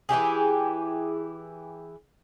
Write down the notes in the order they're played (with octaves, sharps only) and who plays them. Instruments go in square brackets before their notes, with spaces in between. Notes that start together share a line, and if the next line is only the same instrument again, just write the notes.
[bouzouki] E3 E4 G4 G#4